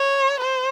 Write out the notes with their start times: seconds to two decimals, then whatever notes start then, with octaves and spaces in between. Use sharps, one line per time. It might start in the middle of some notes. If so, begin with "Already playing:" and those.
Already playing: C#5
0.41 C5